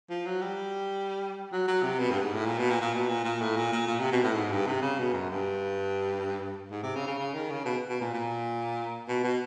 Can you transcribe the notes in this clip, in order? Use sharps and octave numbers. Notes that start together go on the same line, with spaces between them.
F3
F#3
G3
F#3
F#3
C3
B2
G2
G#2
A2
A#2
B2
A#2
A#2
B2
A#2
A#2
A2
A#2
A#2
A#2
C3
B2
A2
G#2
G2
C3
C#3
B2
F#2
G2
G#2
C3
C#3
C#3
C#3
D#3
C#3
B2
B2
A#2
A#2
B2
B2